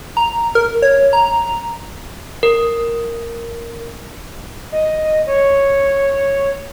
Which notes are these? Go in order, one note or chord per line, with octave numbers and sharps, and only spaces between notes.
A#5
A#4
C#5
A#5
A#4
D#5
C#5